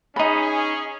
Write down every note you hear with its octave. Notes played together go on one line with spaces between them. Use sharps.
C#4 D#4 G#4 B5